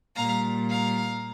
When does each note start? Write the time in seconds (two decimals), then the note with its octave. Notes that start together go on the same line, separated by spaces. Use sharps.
0.15 A#2 G3 F5 A#5
0.71 F5 A#5